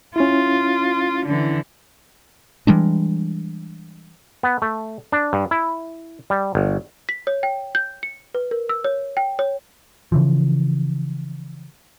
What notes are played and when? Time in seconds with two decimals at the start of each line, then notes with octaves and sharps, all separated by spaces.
0.16 C#4 E4 F4
1.26 D3 E3
2.67 E3 G3 G#3 D4
4.43 B3
4.62 A3
5.12 D4
5.33 G2
5.51 E4
6.30 G3
6.55 G1
7.09 B6
7.27 C#5
7.43 G5
7.75 G6
8.03 C#7
8.34 B4
8.51 A#4
8.69 E6
8.85 C#5
9.17 G5
9.39 C#5
10.12 C#3 E3 F3